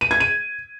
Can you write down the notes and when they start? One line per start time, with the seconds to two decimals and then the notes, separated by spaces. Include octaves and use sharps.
0.01 D#7
0.11 G#6
0.20 D#7